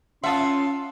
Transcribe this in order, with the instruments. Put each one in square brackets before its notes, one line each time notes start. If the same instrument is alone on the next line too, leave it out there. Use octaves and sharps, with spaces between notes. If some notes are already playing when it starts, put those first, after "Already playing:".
[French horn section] C#4 [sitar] F4 E5 [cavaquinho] F#5 A5 D#6 [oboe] C6